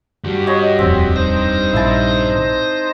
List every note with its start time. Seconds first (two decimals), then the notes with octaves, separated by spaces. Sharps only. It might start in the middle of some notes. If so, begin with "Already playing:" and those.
0.24 G2 F#4 G4
0.47 C#5 D#5 C#6
0.79 D#1 F2 C4
1.16 D#4 C5 A#6
1.73 A#1 E4 A5